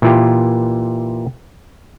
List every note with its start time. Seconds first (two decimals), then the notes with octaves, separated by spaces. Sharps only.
0.02 A#2 E3 E4 F4 G4